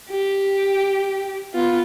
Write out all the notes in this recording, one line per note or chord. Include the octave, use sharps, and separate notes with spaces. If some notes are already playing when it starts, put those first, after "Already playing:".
G4
B3 F4